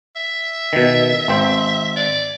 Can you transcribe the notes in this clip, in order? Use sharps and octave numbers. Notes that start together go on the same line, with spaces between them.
E5
B2 D#3
G#1 C4 C5
D5